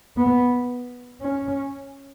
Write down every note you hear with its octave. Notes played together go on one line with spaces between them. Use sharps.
B3
C#4